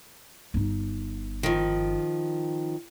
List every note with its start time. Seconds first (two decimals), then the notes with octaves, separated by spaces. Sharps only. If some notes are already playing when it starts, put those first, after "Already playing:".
0.54 G1 D#4
1.43 D#3 F3